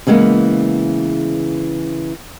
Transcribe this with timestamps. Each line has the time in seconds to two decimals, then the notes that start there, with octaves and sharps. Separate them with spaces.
0.07 C#3 E3 G#3 A#3 B3